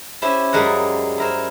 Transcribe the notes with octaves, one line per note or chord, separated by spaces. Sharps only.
C#4 E4 G4 C5
F#2 G3 G#3 A#4 F#5
E4 A#4 C5